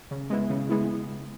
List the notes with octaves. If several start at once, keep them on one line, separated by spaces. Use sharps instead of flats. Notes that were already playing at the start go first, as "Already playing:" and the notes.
C#3
G#3 B3 E4
C#3
G#3 B3 E4